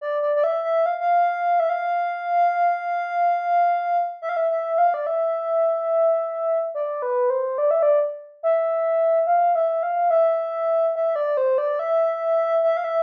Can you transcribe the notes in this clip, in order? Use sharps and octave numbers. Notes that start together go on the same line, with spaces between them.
D5
D5
D5
E5
E5
F5
F5
E5
F5
E5
F5
E5
E5
F5
D5
E5
D5
B4
C5
D5
E5
D5
E5
F5
E5
F5
E5
E5
D5
C5
D5
E5
E5
F5
E5